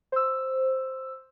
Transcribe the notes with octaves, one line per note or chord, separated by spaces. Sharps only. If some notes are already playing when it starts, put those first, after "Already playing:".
C5 E6